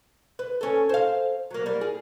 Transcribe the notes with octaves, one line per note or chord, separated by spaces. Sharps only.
B4
C#4 A4
C5 F5
F#3 A#3
G3 A#3
G#4